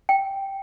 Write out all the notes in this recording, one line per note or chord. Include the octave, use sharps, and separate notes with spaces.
G5